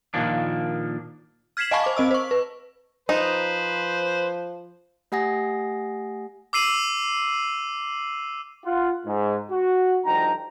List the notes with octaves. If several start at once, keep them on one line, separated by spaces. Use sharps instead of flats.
A#2 D#3 F3 A#3 D4
F6 G#6 B6 C7 E7 F#7
D#5 F5 G#5 A5 B5 C#6
C5 D6
C4 D#5 E6
C5 C#6
B4
F3 D#4 B4 C5
A3 G4 F#5 G#5 D#6 A#6
D6 E6 C7 D#7 F#7
F4 F#5
G#2
F#4
D2 G2 F3 D#4 G5 A#5